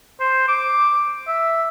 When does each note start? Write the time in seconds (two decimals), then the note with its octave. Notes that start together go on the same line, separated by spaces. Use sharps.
0.20 C5
0.48 D6
1.27 E5